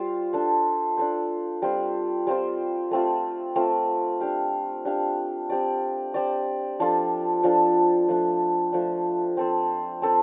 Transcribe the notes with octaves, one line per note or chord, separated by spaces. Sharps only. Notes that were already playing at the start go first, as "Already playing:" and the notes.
Already playing: G3 F4 C5 F5
D4 A4 C5
D4 A4 C5
G3 C4 F4 C5
G3 C4 F4 C5
A3 C4 F4
A3 C4 F4
D4 G4 F5
D4 G4 F5
C4 G4 D5
C4 G4 D5
F3 D4 F4 A4
F3 D4 F4 A4
F3 A3 D4
F3 A3 D4
C4 A4 C5
C4 A4 C5